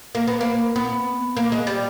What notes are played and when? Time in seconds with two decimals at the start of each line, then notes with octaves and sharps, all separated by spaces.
0.15 A#3
0.27 B3
0.41 A#3
0.76 B3
1.37 A#3
1.52 G#3
1.67 G3